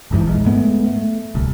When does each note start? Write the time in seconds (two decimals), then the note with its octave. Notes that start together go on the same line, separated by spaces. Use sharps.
0.11 G1 E2 G#2 E3
0.26 A#1 G#2 G#3
0.46 G#2 G#3 A3 B3
0.87 A3
1.35 D1 C2